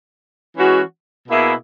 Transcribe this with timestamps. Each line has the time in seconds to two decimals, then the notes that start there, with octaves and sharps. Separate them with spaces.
0.56 E3 G#3 C#4 F#4
1.28 B2 A#3 E4 G#4